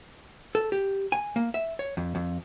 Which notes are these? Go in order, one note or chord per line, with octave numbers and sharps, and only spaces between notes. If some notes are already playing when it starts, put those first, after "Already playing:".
A4
G4
G#5
A#3
E5
C#5
F2
F2